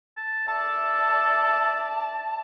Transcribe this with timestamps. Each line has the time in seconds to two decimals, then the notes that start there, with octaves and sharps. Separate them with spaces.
0.17 A5
0.48 A4 D5 E5 A5